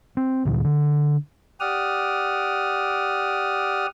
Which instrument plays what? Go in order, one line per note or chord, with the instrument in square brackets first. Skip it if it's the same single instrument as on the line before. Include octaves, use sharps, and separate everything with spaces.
[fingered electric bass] C4
D2 A#2 E3
D3
[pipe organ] G4 D5 F#5 D#6 F6